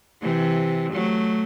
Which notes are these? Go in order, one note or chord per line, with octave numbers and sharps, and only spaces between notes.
C3 E3
F#3 A3